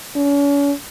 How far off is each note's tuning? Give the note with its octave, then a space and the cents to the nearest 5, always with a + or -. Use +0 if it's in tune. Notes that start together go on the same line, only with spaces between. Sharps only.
C#4 +40